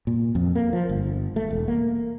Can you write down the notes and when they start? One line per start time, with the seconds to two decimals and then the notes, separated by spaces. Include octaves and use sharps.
0.07 A#2
0.35 F2
0.55 A#3
0.73 F3
0.89 G1
1.36 A3
1.51 E1
1.68 A#3